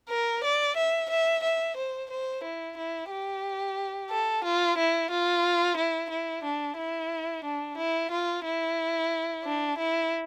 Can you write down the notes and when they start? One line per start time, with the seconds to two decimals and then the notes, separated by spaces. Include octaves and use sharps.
0.09 A#4
0.44 D5
0.77 E5
1.10 E5
1.44 E5
1.77 C5
2.11 C5
2.44 E4
2.78 E4
3.11 G4
4.10 A4
4.45 F4
4.78 E4
5.11 F4
5.77 E4
6.10 E4
6.44 D4
6.77 E4
7.44 D4
7.77 E4
8.11 F4
8.45 E4
9.45 D4
9.78 E4